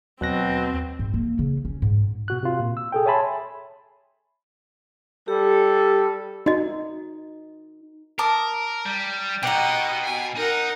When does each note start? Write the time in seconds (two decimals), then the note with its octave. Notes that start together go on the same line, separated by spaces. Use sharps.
0.21 D#2 B2 F#3 C4 F#6 A#6
0.99 G#2
1.14 A#3
1.39 C#3
1.65 C#4
1.82 G#2
2.28 B2 F#4 F#6
2.43 C3 F4
2.60 A#2
2.77 E6
2.92 G#4 A4 G5
3.06 C#5 E5 G#5 A5 B5 C6
5.28 G3 G4 A4
6.46 D#4 F#4 D#5
8.19 A#4 A5 D6 D#6
8.86 G3
9.43 B2 D#4 G4 D#5 F#5
10.04 G#5
10.37 D#4 A#4 F#5